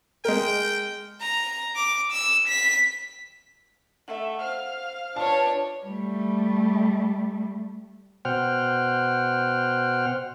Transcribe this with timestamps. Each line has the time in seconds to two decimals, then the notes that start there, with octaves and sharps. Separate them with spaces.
0.25 G#3 A#4 G5
1.21 A#5
1.76 D6
2.12 E6
2.48 B6
4.08 A3 D#5 E5 F#5
4.40 C5 F5 F6
5.16 D4 F4 B4 C#5 A5
5.86 G3 A3
8.25 B2 C5 F#5 G5 F6